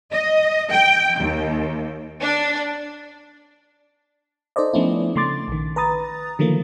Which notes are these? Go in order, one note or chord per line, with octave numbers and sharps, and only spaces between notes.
D#5
G5
D#2
D4
D#4 A4 C5 D5 D#5
F3 A3 B3 C#4 D4 E4
C#3 A3 C6 D6 A6
A#1 D#3
B4 A#5 D#6 A6
D3 D#3 F3 F#3 A3 A#3